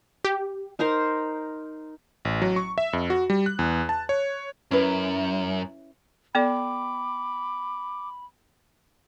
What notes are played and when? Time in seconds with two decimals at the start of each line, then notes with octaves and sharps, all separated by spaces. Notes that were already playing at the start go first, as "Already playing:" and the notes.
0.25 G4
0.79 D#4 A#4 C5 A#5
2.25 A1
2.42 F#3
2.56 C#6
2.78 E5
2.93 F2
3.10 F#4
3.30 G3
3.46 F#6
3.59 E2
3.89 A5
4.09 C#5
4.71 F#2 C#4 E4 B4
6.35 B3 A4 D5 G5 B5 D6